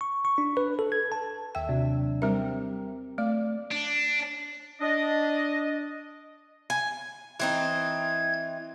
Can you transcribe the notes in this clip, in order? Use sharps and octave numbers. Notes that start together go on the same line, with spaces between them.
C#6
C#6
D4
B4
A4
G#6
A5
D#2 E5 G5
C3 F#3 D4
G3 C4 G4 A#4 E5
A3 D5
D4
D4 D#5
G#5
E3 C4 D#4 G#6